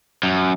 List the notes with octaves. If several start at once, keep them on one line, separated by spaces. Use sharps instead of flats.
F#2